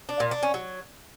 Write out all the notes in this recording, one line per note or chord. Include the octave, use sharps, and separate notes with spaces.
D4
A#2
D4
C#4
F#3